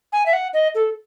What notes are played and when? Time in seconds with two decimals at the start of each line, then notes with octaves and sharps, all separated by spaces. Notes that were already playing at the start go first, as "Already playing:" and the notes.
0.13 G#5
0.26 E5
0.33 F#5
0.54 D#5
0.75 A4